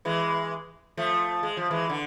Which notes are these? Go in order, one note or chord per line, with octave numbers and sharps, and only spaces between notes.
E3 G#3
F3 A3
G#3
F3
E3 G#3
D3